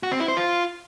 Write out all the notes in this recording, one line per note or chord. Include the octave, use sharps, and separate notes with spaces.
F#4
C4
E4
C5
F4